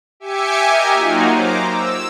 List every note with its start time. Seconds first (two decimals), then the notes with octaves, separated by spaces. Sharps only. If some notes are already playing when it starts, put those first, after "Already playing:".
0.20 G4 E5 G#5 D6 C#7
0.61 G4 A#4 D#5 G#5
0.93 F#3 A#3 D#4 F4 F#4
1.34 C5 A#5 D6
1.68 E6